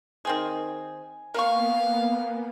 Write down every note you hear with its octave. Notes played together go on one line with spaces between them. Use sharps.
D#3 C4 G#4 G#5
A#3 B3 A#4 F5 C#6